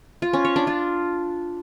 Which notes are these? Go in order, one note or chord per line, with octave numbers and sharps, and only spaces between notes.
F4
C#4
C#5
D4
F4